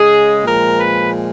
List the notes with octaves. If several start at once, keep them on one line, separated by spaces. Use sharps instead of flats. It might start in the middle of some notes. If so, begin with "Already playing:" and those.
Already playing: C#3 G#3 G#4
A#2 F3 G#3 A#4
B4